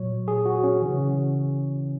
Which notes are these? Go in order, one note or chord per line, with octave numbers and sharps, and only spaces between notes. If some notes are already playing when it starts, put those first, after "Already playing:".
Already playing: A#2 F#3 C#5
G#4
F#4
C#4
C#3 E3